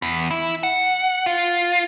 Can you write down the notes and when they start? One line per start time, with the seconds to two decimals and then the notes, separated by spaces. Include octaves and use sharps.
0.02 E2
0.31 E4
0.63 F#5
1.26 F4